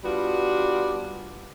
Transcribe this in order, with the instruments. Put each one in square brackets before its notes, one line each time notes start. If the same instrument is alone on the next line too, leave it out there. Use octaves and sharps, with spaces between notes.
[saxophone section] G3 B3 D4 F4 F#4